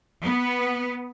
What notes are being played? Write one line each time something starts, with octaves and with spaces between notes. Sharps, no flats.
B3